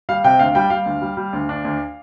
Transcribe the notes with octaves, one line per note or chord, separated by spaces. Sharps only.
G3 F5
C3 G5
D2 F5
G3 G5
G3 F5
D2
G3
G3
D2
D4
D2